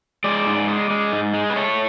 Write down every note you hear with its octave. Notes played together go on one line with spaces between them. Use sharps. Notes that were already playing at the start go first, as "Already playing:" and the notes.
G#3 D5
G#2
G#3
G#3
G#2
G#3
B4
A3 C#5